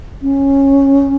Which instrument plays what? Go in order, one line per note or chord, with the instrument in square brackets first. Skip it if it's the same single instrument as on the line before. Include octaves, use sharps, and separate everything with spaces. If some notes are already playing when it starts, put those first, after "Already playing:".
[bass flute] C#4